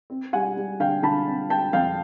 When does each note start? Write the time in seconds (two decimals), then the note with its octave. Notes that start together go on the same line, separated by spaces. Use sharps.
0.10 C4
0.33 G3 F#5 G#5
0.57 G3
0.80 D3 F5 G5
1.03 D3 A5 B5
1.26 C4
1.49 C4 G5 A5
1.73 F2 F5 G5